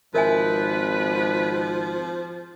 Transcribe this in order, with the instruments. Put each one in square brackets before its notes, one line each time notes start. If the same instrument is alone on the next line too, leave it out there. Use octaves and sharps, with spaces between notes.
[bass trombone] G#1 [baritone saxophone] F3 [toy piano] A#4 E5 G#5 [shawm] B4